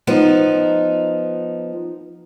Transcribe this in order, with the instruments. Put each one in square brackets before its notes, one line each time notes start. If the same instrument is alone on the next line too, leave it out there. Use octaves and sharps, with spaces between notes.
[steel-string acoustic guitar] F3 B3 D#4